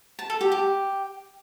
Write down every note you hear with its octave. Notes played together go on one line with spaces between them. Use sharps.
A5
A4
G4
G4